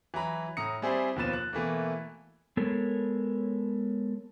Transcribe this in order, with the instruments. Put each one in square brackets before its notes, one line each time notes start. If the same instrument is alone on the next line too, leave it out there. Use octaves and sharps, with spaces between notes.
[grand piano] E3 F#3 A#5 B5
A2 A#5 D#6 C#7
G3 C4 E4 G#4 C5 D5
D#2 B2 F3 B4 A6 E7
F#6
B2 E3 A3 A#3
[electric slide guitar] G#3 B3 A4 A#4 C#5